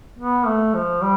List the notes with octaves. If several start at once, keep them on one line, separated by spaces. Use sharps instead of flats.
B3
A3
F3
G3